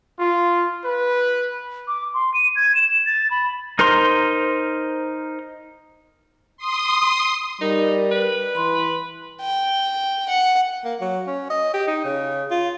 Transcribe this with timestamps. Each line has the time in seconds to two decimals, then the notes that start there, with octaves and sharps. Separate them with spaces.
0.19 F4
0.85 B4
1.88 D6
2.14 C6
2.34 D#7
2.56 G#6
2.75 E7
3.06 A6
3.31 B5
3.79 D#4 A#4 C5 A#5 C6
6.57 C6 D#6
7.61 G3 D#4 A#4
8.11 B4
8.55 E3 B5 C6
9.41 G5
10.29 F#5
10.85 A#3
11.01 F#3
11.27 C#4
11.50 D#5
11.74 G4
11.87 D#4
12.05 C#3
12.51 F4